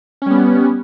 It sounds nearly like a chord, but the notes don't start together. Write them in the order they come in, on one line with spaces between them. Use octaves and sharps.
C#4 G3 B3